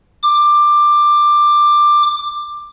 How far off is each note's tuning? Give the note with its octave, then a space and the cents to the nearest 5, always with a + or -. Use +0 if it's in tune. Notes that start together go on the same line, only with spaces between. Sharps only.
D6 +15